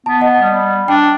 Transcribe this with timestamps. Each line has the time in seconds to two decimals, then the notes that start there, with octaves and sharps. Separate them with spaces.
0.06 B3 A5
0.20 D#5 F#5
0.41 G3
0.88 D4 G5